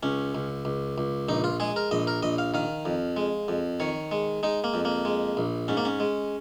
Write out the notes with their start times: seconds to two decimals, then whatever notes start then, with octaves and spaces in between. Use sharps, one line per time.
0.03 C#2 C#4
0.35 C#2
0.65 C#2
0.98 C#2
1.29 A#1 D#4
1.44 F4
1.60 G#3 G#4
1.76 A#4
1.91 A#1 D#5
2.07 A#4
2.23 A#1 D#5
2.38 F5
2.54 D#3 F5
2.85 F2
3.17 G#3
3.48 F2
3.80 D#3 C#5
4.11 G#3
4.43 G#3 D#4
4.64 A#3
4.74 F2
4.85 A#3
5.05 G#3
5.37 A#1
5.68 G#2 C#4
5.77 A#3
5.85 C#4
6.00 G#3